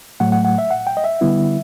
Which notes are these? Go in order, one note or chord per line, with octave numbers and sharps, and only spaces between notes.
A2 F#3 A3 F#5
F#5
F#5
E5
F#5
G5
D#5
E5
D3 G3 B3 E4